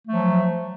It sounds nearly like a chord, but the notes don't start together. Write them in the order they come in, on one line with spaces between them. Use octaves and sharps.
A3 F#3 F3